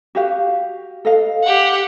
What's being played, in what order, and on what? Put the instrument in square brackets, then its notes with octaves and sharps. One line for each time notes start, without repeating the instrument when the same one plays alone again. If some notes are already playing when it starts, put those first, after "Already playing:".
[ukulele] F#4 G4 F5
A4 D#5 F5
[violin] G4 F#5